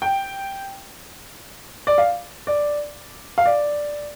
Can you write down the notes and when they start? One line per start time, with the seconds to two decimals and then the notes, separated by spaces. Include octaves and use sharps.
0.02 G5
1.87 D5
1.98 F5
2.47 D5
3.38 F5
3.46 D5